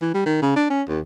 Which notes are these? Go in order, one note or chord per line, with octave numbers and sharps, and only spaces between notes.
E3
G3
D#3
C#3
D4
C#4
D#2